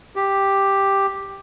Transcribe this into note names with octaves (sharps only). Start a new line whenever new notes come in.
G4